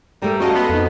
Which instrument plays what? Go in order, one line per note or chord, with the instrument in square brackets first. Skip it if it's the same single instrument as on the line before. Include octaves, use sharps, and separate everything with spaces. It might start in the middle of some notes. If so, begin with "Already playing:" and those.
[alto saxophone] G3 [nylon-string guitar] A3 A#4
[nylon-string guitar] C#4 A4 [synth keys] F#4 D#5 F5
[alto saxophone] B3 [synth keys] B4 D#5 C6
[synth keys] F2 D#4